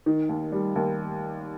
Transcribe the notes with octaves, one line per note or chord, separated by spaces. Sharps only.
D#3
D#2
G3
D#2